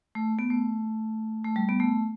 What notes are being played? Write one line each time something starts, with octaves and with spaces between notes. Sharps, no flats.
A3
B3
A3
A3
G3
B3
A3